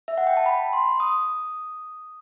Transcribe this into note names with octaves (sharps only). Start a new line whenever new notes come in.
E5
F#5
G5
A5
B5
C6
D#6